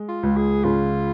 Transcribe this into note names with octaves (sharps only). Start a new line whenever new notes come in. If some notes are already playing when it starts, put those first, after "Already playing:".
Already playing: G#3
F4
C#2
G#4
C#3 F4